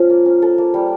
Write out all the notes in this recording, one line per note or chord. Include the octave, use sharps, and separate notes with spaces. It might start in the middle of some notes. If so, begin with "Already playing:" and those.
Already playing: F3 C#4 F4
A#3
C#4
A4
A#3
G3